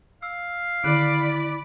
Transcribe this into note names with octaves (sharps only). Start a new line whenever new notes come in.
F5 E6
D3 D#3 E4 D5 B5 D6 F#6